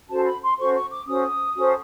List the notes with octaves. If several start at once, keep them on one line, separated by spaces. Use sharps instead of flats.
C#4 F#4 A4 C5 A5
B5
C6
C#4 F#4 A4 C5 C#6
C#6
D6
C#4 F#4 A4 C5 D#6
C#4 F#4 A4 C5